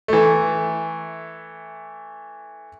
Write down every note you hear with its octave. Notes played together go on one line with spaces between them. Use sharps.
E3 A3